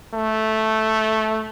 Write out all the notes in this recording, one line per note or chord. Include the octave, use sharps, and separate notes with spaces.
A3